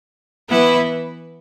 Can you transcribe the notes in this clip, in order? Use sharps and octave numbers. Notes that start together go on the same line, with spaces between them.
E3 B3 E4 B4